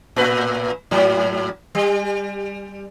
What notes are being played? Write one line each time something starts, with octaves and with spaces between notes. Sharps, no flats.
A2 B4
G#2 F#3
G3